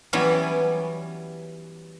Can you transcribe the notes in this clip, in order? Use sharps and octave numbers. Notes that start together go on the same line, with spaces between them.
E3 F#3 G3 B3 C#4